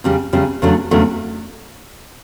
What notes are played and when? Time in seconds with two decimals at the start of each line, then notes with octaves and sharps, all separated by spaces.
0.04 E2 C#3 G3
0.33 E2 C#3 G3
0.62 E2 C#3 F#3 A3 D4
0.91 E2 C#3 F#3 A3 D4